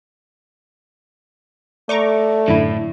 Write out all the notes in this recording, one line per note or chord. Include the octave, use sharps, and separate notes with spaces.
A3 D5 A#5 C#6 D6
F#2 A2 D3 E4